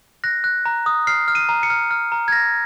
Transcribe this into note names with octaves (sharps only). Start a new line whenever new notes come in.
F#6 A#6
F#6
A#5
D#6
F6 C7
F6
D#7
A#5
C#7
F6
F6
A#5
G#6
F6 A#6